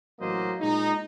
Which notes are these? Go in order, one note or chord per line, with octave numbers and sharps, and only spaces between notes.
A1 F#3 A#3 C5 D#5
A#2 G#3 D#4